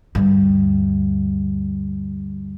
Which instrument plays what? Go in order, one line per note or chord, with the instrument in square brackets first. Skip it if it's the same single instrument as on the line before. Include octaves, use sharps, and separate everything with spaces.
[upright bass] D2 G2